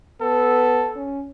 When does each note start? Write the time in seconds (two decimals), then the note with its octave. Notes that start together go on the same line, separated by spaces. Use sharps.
0.21 B3 A4
0.96 C#4